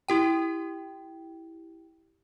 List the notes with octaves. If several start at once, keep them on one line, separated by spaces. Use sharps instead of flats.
E4 G4 G5